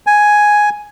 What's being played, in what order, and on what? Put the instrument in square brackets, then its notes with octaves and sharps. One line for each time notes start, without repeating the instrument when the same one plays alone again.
[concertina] G#5